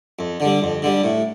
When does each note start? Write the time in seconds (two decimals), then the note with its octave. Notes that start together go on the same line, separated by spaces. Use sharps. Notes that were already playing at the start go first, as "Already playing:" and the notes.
0.19 F2
0.40 D3
0.45 G3
0.62 F2
0.82 D3 G3
1.04 A2